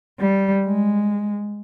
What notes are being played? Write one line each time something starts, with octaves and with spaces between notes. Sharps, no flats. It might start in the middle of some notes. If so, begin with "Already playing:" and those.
G3
G#3